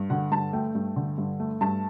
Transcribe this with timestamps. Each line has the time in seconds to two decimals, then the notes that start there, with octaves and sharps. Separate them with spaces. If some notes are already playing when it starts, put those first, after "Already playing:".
Already playing: G2
0.10 D3 F#5
0.31 G2 A5
0.53 A3 G5
0.75 G2
0.96 D3
1.18 G2
1.40 A3
1.61 G2 A5